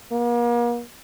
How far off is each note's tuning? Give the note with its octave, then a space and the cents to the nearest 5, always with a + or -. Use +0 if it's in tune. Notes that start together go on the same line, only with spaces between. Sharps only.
A#3 +40